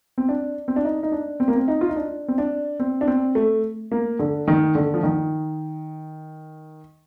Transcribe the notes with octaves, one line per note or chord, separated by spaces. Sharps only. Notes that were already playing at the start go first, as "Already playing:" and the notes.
C4
D4
C4
D4
D#4
D#4
D4
C4
A#3
C4
D#4
F4
D#4
D4
C4
D4
C4
D4
C4
A3
A#3
D3
D#3
D3
F3
D#3